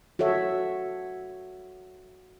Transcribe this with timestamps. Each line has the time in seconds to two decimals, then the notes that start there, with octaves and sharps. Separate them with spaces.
0.19 F#4 A4 C#5 E5